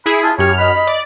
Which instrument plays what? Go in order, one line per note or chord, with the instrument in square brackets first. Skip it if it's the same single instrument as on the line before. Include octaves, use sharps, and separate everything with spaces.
[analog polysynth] E4 G#4 [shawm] B5
[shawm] F4 [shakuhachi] A5
[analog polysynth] F#2 F6 [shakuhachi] G4 [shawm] C#5
[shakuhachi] D#5 [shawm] B5
[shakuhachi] D#5
[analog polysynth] D5